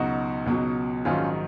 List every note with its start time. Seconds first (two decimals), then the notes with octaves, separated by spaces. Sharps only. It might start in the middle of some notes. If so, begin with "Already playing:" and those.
Already playing: C#2 B2 F#3 D#4 F#4
0.46 C#2 B2 F#3
1.05 A#1 G#2 D#3 F#3 C#4 F4